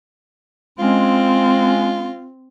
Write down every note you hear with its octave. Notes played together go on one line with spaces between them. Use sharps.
G#3 C4 C#4 F4